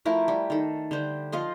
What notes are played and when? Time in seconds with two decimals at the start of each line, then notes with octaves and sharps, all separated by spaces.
0.05 F3 A3 E4 A#4
0.28 G3
0.50 D#3 A4
0.91 D3 G3 C5
1.32 F3 F4 D#5 C6